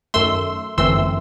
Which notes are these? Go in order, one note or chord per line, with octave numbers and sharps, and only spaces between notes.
F#2 D#3 A3 C6 E6
G1 F#2 E3 A3 C4 C6 E6